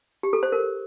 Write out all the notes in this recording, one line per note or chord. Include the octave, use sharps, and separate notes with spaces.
G4
A4
C5
A#4